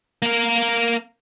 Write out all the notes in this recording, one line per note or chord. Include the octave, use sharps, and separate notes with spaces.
A#3 A#4